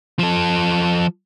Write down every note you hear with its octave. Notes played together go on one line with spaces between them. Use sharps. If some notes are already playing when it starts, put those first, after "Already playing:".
F3 A4